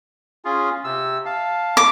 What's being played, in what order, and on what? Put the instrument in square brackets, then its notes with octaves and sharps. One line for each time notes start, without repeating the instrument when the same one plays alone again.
[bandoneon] C#4 F4 G#4
C3 E6
F5 A5
[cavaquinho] D6